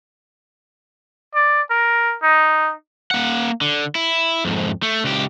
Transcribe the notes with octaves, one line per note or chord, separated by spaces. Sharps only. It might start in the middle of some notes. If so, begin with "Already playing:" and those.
D5
A#4
D#4
A#3 F#5
D3
E4
F2 G#2
A3
C#2 G4